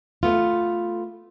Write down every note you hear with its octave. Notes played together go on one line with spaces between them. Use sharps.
A3 B3 F4